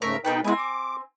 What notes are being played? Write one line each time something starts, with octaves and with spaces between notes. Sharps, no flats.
G#2 C#3 A3 A#4 C#5 E5
B2 A#3 D#4 A4 B4 G5
G#3 B3 C4 E4 G#5
D6